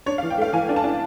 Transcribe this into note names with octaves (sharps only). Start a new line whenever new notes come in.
D4 C#5
F5
E3
G5
A3 F5
E3 G#5
D4
A5
D4